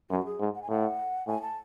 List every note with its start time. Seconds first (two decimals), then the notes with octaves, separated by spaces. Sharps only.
0.10 F#2 F#4
0.26 G#4
0.40 G#2
0.55 F#5
0.62 G#5
0.69 A2 F#5
1.27 A2 G#5
1.42 A5